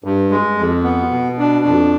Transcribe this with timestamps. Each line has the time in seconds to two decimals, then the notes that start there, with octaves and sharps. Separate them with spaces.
0.04 G2
0.31 G#3
0.58 F2
0.84 B3
1.11 B2
1.39 D4
1.65 F2